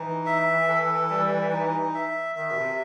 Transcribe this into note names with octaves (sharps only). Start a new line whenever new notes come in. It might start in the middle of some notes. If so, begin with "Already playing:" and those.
Already playing: E3 D#4
E5
A4
G3
D#4
E5
D#3 E5
B2
C3